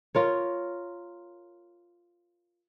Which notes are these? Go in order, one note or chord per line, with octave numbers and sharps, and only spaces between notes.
F4 A#4 C#5